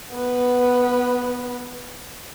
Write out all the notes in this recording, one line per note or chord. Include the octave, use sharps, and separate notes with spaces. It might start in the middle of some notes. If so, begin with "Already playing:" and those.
B3 B4